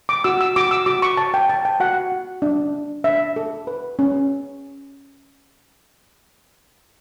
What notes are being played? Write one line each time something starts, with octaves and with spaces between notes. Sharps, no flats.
D6
F#4 E6
E6
F#4 D6
E6
F#4 D6
C#6
C#5 A5
G5
C#5 A5
G5
F#4 F#5
F#4
D4
D4
D4 E5
A4
B4
C#4